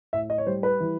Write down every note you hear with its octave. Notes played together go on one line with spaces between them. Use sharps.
A2 E5
D#5
C#5
G3 C5
B4
E3